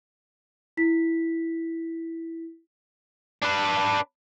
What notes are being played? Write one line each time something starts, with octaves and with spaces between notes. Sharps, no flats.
E4 B6
D4 B4